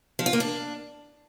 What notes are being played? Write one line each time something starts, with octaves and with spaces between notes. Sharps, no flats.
F3
F4
A#3
D4